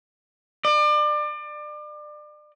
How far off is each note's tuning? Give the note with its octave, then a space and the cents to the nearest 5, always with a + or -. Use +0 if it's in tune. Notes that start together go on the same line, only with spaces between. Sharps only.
D5 +30